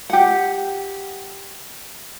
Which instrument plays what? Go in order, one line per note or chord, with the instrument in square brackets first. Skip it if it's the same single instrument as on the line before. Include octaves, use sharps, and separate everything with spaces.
[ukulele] G4 F#5